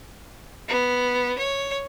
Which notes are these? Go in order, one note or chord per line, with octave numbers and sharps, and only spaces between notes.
B3
C#5